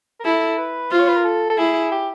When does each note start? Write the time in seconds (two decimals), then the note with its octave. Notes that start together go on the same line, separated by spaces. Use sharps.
0.20 A#4
0.25 E4 A4
0.58 B4
0.91 F4 C5
1.00 C#5
1.08 B4
1.16 A#4
1.25 A4
1.50 A4
1.58 E4 G#4
1.92 G4